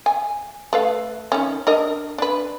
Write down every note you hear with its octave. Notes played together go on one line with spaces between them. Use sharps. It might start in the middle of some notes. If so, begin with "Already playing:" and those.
G#5
A3 B4 F5
D#3 C#4
D4 A#4 D#5
D4 B4